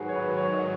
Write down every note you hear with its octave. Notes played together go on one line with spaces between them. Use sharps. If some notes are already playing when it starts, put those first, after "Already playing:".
Already playing: G#2 D#3 F#3 F#4 G#4 B4
C#5
B4
C#5
D#5